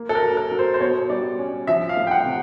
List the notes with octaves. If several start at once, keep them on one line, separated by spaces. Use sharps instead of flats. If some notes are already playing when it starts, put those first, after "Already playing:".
Already playing: A#3
A4
A#4
F#3
A#4
F#3
C5
C5
B2 C#5
G3 D5
C#4
F3 E5
F5
A3
G5
F#5
C3